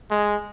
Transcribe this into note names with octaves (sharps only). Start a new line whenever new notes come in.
G#3